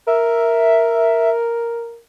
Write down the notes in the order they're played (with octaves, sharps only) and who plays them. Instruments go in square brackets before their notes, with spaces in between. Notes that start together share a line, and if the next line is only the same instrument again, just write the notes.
[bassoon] A#4 [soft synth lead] E5